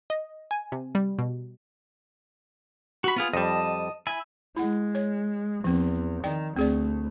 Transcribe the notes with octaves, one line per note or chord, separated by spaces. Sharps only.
D#5
G#5
C3
G3
B2
F#4 B5
B3 F4 G#4
F2 G3 D#5 A5
E4 G#5
G#3 E4 F#5
C#5
E2 F3 C4
D#3 D5 G5
D2 A3 C4 G#4 D5